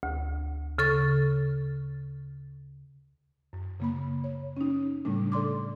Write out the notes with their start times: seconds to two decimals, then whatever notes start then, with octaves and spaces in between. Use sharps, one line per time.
0.03 D2
0.78 C#3 A4 C#6 A6
3.53 F#2
3.80 C#3 A#3 B5
4.24 C#5
4.57 C#4 D#4
5.05 A2 C#3 G3 A3 D4
5.32 A4 D5 C6 D6